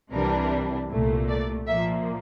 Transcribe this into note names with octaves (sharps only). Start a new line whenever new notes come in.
C2 C3 E3 G3 D4 A#4
C2 A#2 A3
D5
A#2 F3 A#3 E5